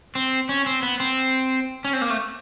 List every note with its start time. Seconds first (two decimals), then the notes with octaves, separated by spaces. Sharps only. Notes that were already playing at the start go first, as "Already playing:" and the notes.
0.15 C4
0.49 C#4
0.66 C4
0.83 B3
1.00 C4
1.85 C#4
1.93 C4
2.01 A#3
2.10 A3